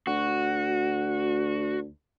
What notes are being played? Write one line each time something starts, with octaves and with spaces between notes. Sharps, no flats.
D2 F#4